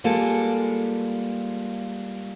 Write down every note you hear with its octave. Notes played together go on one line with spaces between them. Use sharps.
G3 G#3 A#3 F4 G#4 A4